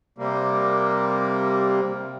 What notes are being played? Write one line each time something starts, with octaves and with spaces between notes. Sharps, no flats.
C3 G3 A#3